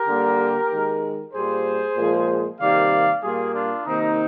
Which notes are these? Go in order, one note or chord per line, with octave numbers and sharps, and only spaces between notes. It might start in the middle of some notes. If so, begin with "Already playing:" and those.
Already playing: G4 A#4
D3 G3 A#3
D#3 G#3
A#2 G3 A#3 G#4 C5
A#2 F3 G#3
C3 D#3 G3 A#3 D5 F5
A#2 G3 A#3 F4 G#4
D4 F4
C3 D#3 A#3 C4 D#4